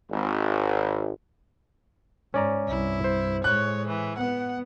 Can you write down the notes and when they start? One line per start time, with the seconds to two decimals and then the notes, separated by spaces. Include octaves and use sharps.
0.11 G#1
2.34 G#2 C#4 D5 A#5
2.68 C2 G2 E4
3.04 C5
3.44 A2 G#3 C#5 F#6
3.88 E3
4.18 B3 F#5